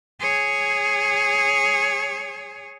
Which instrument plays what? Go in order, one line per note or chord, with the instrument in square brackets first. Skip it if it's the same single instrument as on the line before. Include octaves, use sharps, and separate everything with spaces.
[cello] G#4 C#5